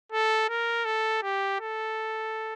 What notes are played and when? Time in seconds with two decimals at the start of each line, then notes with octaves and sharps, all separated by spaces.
0.12 A4
0.49 A#4
0.85 A4
1.23 G4
1.60 A4